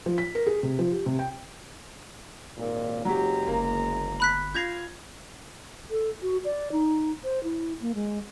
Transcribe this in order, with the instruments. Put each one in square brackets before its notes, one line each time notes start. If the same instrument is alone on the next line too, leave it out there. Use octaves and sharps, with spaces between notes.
[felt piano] F3
B6
A#4
G#4
C3
F3
G4
C3
G5
[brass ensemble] G#1 D#2 A#2
[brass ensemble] F#1 G#3 A#5 [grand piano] F#3 G4
[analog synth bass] G1 [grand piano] A#3
[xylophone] B5 F#6 B6
[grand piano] F4 G#6 F7 [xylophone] G6 A#6 C7
[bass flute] A4
F#4
D5
D#4
C5
E4
A#3
G#3